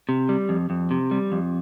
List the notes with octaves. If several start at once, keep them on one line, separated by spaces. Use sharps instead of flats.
C3
G3
F2
F2
C3
G3
F2